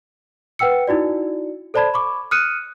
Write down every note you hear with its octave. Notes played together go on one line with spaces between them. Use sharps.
B4 F#5 G5 E6 C#7
D#4 E4 F#4 D5
A4 C5 D5 A5 B5 G#6
B5 C#6 D6
D#6 F6 F#6 C#7 D#7